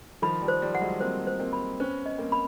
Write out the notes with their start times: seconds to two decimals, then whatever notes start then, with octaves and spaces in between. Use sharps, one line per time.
0.22 D#3 F3 B5
0.42 F3 G3
0.48 C5
0.62 F3 G3
0.75 F#5
0.81 F#3 G#3
1.00 A#3 C4 C5
1.27 C5
1.40 A#3 C4
1.53 B5
1.80 B3 C#4 C5
2.06 D#5
2.18 A#3 C4
2.32 B5